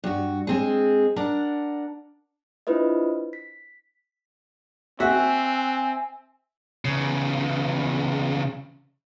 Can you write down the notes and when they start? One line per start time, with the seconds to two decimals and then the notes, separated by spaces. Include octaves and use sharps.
0.04 G2 F#4
0.47 G#3 C4 G#4
1.16 D4 A#4 F#5
2.67 D4 E4 F4 B4 C5 D#5
3.33 B6
5.00 C4 F#4 E5 G#5
6.85 E2 C#3